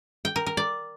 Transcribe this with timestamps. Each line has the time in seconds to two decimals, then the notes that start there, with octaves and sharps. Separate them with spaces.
0.25 G5
0.36 A#4
0.46 A#4
0.57 D5